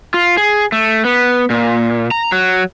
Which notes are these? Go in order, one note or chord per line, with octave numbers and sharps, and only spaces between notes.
F4
G#4
A3
B3
A#2
A#5
F#3